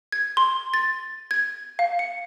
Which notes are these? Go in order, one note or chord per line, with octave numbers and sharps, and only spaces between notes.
G#6
C6
A6
G#6
F5
C#7